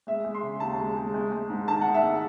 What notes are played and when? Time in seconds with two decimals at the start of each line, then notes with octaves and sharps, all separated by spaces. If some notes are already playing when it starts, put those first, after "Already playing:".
0.07 G#3 E5
0.25 G#3
0.34 C6
0.43 C#3
0.60 D#2 A5
0.79 G#3
0.97 G#3
1.14 G#3
1.32 G#3
1.50 G#2
1.67 D#3 A5
1.81 G#2 F#5
1.94 E5
2.03 G#3